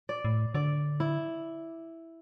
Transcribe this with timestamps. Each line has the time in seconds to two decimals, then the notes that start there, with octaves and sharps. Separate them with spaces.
0.09 D5
0.25 A2
0.54 D3 D5
1.00 E4